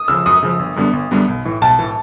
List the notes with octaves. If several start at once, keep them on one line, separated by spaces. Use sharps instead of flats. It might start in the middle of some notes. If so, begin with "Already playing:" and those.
Already playing: D#6
C#3 F3 E6
F#2 D#6
C#3 F3
G1
F#2 D3 G3 B3
G1
F#2 D3 G3 B3
B1
A2 E3
B1 A5
A2 E3